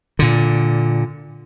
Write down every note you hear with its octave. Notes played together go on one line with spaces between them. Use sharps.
A#2 D3